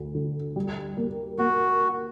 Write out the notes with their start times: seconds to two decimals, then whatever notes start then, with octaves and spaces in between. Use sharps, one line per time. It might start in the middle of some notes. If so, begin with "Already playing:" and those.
Already playing: D2 D3
0.15 D3
0.56 G3
0.97 A#3
1.38 A#3 F#4